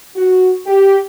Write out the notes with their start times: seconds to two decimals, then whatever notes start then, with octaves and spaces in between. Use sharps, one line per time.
0.16 F#4
0.66 G4